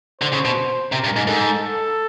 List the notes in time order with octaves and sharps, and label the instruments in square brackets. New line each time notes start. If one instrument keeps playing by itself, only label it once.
[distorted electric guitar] D3 [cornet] C5
[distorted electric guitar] C#3
B2
[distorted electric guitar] C3 [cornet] A#4
[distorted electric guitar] G2
G#2
[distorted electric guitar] G#2 [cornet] A4
[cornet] A4